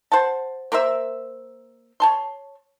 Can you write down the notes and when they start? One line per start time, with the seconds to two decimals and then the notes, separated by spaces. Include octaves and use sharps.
0.12 C5 F#5 A5
0.72 A#3 A#4 C5 E5
2.00 C#5 A5 C6